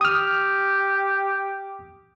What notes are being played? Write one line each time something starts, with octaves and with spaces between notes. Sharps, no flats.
G4 D#6 F6